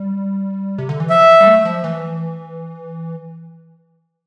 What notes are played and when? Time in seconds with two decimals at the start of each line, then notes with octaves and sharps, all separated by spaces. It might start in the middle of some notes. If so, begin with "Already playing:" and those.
Already playing: G3
0.78 C3
0.89 D3
1.00 E3
1.10 F3 E5
1.41 G3
1.47 A3
1.65 F3
1.84 E3